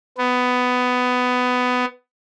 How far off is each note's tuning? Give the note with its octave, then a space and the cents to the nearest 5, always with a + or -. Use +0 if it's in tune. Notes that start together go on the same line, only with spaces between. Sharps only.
B3 +15